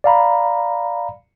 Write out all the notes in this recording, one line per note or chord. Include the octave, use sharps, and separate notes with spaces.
D5 F5 A#5 B5